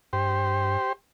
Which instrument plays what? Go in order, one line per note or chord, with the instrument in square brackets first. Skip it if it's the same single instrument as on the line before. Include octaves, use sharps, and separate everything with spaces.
[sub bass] G2 [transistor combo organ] G4 C5